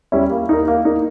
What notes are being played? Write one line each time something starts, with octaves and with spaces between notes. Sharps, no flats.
G3 C#4 E4
A#3
D#4 A#4
A#3
D#4 A#4